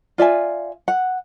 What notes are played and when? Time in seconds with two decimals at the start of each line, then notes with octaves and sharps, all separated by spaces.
0.18 F4 D5 E5 G#5
0.88 F#5